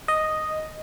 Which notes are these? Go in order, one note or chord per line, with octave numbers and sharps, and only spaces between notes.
D#5